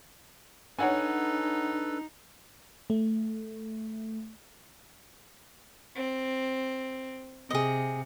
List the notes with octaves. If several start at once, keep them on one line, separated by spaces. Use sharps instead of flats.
D4 D#4 A4 B4 C#5 F#5 G#5
A3
C4
C3 G#4 D#5